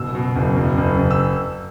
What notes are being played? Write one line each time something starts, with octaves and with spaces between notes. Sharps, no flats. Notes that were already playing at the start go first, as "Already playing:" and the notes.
Already playing: F#1 B2 E6
B2
F#1
F#1
F#1
F#1
E6